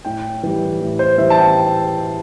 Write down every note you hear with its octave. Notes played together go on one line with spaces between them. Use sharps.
A2 G5
E3 G3
A2
C5
E3 G3 E5
A5
G5